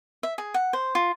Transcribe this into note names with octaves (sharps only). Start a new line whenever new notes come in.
E5
G#4
F#5
C5
F4